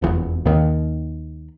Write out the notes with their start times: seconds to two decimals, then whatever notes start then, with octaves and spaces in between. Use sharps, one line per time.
0.02 F1 E2
0.46 D#2 D#3